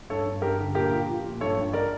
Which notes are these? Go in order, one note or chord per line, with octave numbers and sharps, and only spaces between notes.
G2 A4 C#5
G2
G2 G4 A#4
D3
A#2 G4 A#4
F3
F3
A#2
G2 A4 C#5
G2
A#4 D5